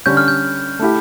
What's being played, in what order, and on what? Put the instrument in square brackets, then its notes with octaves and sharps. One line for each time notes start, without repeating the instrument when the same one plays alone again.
[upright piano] D3 G3 C#4 [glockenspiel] G6
[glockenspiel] F6
G6
[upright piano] A3 E4 G4